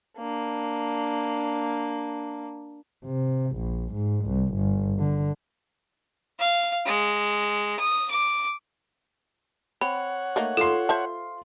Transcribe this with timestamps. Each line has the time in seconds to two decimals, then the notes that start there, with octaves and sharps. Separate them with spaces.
0.17 A#3 D4
3.06 C3
3.57 A#1
3.94 G#2
4.26 C2
4.55 G1
4.99 D3
6.39 F5
6.86 G#3
7.79 D#6
8.10 D6
9.81 C4 C#5 F#5 B5
10.36 A3 A#3 D#4
10.57 F4 A4 C6 C7
10.89 C5 E5 A5